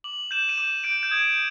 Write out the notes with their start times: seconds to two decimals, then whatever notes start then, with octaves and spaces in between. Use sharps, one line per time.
0.04 D6 F#7
0.31 G6 E7
0.49 D#7
0.57 D6 E7
0.84 G6 D7
1.03 G6
1.11 D#6 G#6